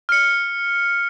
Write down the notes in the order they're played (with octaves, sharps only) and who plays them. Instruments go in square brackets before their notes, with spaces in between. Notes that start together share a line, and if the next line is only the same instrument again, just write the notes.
[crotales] F6 C#7